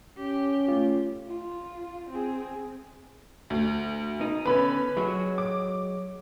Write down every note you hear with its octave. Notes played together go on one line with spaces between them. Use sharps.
C#4 G4
A3 F4
F4
C4 G#4
D2
D#4
D3 B3 C#4 B4 B5
F#3 G#3 F#4
D6